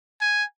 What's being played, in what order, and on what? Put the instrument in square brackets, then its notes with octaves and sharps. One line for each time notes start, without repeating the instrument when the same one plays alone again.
[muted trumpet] G#5